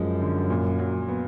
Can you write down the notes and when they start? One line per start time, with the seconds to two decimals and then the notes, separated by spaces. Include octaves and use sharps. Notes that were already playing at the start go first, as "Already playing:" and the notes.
Already playing: F#2 F3 G#3 C#4
0.21 D3
0.50 A#2
0.79 F#3
1.08 B3